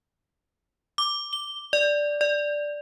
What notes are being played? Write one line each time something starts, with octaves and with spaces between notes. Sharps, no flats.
D6
G7
D5
D5